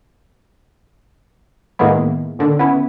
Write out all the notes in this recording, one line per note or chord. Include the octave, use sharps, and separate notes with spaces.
A2 D#3 G#3 A#3 B3 E4
A#2 D3 D#3
B3 C#4 E4